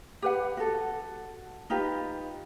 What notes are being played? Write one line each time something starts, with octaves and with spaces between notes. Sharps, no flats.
G4 B4 F#5
F#4 A4
D#4 F4 G4 B4